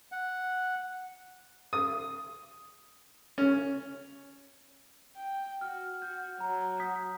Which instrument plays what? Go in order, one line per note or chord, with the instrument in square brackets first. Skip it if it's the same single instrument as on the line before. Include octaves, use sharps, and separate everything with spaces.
[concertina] F#5
[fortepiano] D#6
C#4
[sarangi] G5
[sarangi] F#4 [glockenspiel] F6
[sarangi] F#4 [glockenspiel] G6
[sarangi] F#3 [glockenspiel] A#5
[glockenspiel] D#6 G6 B6